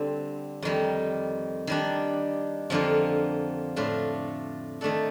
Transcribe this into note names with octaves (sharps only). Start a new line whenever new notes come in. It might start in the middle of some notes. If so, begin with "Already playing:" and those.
Already playing: D3 G3 C4
F2 D#3 G3
D#3 G3 D4
F2 D3 F3 A#3 F4
A2 A3 D4 F4
D#3 A3 D4 A4